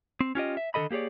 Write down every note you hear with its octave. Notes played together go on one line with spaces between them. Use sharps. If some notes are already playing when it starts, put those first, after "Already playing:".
C4
C#4 F4 G4 D#5
E5
D3 D#3 A4 D#5 B5
A#3 G4 G#4 C#5 D5